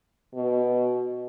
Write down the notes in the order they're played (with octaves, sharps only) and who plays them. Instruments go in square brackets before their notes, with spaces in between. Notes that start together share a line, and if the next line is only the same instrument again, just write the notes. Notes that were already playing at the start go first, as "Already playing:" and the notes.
[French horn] B2